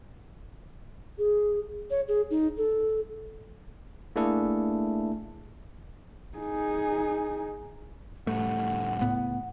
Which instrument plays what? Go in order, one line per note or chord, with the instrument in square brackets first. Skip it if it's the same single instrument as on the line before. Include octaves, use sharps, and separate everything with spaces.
[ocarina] G#4
C#5
G#4
D#4
A4
[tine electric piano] A3 A#3 D4 E4 G#4 A4
[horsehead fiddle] D#4 G#4
[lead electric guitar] A2 G3 [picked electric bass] A3 [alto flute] F#5
[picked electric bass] C#2 A2 B3